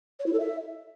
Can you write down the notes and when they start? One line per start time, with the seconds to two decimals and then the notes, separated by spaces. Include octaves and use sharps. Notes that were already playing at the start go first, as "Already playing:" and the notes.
0.19 C#5
0.26 E4
0.33 A4
0.39 E5